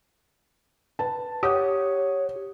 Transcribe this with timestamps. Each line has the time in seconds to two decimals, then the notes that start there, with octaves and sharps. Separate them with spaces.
0.99 B4 A5
1.43 G4 C#5 F#5 D#6